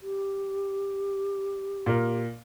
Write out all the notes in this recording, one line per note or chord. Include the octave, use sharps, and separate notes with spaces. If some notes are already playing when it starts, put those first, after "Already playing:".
G4
A#2 A#4